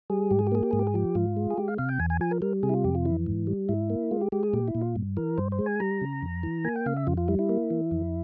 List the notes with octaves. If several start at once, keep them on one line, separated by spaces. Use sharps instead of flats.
G3 G#4
G#2 G4
G#4
G4
A#3 G#4
G4
G#2 G#4
G4
G#4
F3 G4
G#2 F4
G#3
G#4
G#3 G4
F5
C3 F5
G5
E2 G#5
G#5
F3 G#5
A#4
G3 A#4
C3 G#4
E4
F4
F2 G4
F4
E3 E4
G#2
G3
G#2 E4
A#3
G#3 F4
G4
G#3 G4
G#4
A#2 G4
E4
A#2
F4
G2
E3 A#4
G2 C5
C5
G#3
G#5
G3 A#5
C#3
F2
E3
A#3 G#5
G5
C#3 F5
E5
F2 F4
F4
G3 E4
E4
A#3
E3
F2